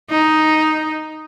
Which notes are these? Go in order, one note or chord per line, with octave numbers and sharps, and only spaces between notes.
D#4